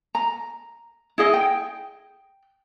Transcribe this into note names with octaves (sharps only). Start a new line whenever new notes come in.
A#5
E4 G#4 D#5
G5